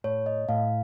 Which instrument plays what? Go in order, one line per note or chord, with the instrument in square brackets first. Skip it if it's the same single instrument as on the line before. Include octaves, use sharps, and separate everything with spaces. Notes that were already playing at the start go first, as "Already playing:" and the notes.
[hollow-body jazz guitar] A2 [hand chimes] C#5
[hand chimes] D#5
[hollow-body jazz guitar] A2 [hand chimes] F5